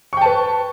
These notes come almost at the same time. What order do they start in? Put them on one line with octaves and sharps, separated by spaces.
C#6 G5 A5 B4